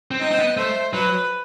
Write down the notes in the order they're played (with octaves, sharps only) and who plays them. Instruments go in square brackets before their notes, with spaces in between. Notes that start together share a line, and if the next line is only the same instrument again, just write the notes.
[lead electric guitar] C4
[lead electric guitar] D#4 [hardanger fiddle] D#5
[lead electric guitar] C4
B3
[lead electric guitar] A3 [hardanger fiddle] C5
[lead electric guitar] F#3 [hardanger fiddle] B4